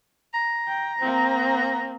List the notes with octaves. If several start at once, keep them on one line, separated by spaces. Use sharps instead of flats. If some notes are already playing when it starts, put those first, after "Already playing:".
A#5
G5
A#3 C4